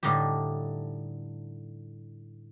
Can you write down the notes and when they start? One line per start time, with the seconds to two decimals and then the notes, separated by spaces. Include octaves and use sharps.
0.03 A2 D3 G3 D#4 G4